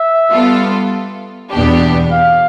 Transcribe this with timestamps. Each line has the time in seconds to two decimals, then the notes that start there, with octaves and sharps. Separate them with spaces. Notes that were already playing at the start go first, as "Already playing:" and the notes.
Already playing: E5
0.30 G3 B3 F4 A4
1.52 E2 B2 B3 D4 G4
2.12 F5